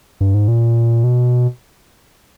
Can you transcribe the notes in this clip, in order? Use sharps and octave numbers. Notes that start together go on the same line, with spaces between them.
G2
G#2
A#2
B2